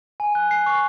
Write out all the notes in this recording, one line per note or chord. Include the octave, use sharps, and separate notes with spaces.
G#5
F#6
C7
C#6